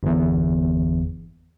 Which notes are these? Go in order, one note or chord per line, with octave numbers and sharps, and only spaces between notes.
G1 E2